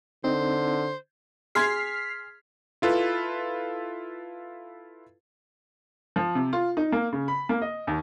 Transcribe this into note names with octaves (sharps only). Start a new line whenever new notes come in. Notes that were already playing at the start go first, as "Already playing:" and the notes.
D3 C4 D#4 C5
G#4 C6 F6 G#6 B6 C7
E4 F4 A4 B4
F3
C3
F4
D#4
A#3
C#3
B5
A#3
D#5
D#2